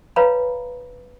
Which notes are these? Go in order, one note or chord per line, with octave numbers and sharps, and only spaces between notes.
B4 C#5 F5 G#5 A#5 B5